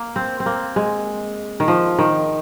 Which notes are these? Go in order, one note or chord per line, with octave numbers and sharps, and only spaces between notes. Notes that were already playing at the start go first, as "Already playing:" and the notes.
Already playing: A#3
C4
C4
A#3
G#3
D#3
F3
D#3